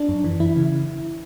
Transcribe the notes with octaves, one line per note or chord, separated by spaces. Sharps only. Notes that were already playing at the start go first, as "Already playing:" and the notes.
Already playing: D4
F#2
E3
E3 E4
C#3